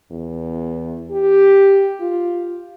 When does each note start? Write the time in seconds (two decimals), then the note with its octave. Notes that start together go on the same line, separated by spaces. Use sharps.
0.11 E2
1.11 G4
2.00 F4